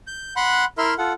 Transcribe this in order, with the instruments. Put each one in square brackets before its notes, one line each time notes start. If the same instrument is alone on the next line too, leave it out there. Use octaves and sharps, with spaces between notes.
[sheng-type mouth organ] G6
F#5 B5 C6 F#6
E4 A#4 E5 C6 F6
F4 A4 F#5